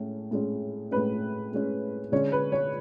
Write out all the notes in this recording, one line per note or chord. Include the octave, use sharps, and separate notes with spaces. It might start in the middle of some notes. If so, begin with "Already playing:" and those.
Already playing: A2 G#3 C#4
A2 G#3 C#4
A2 G#3 C#4 B4
A2 G#3 C#4
D3 G#3 C#4 C#5
B4
C#5